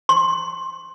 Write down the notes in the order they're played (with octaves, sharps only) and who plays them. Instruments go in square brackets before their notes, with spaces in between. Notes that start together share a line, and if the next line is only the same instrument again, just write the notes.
[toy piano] C6